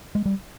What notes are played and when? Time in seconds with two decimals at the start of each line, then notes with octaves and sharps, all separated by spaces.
0.15 G#3
0.26 G3